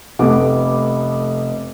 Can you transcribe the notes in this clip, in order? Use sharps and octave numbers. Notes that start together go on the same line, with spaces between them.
F1 A3 B3 D6